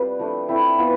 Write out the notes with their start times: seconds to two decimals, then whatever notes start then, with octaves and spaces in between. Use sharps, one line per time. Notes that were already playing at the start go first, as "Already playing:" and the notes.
Already playing: G3 C4 F4 B4
0.19 F3 A3 D4
0.49 A3 C4 E4
0.78 B3 F4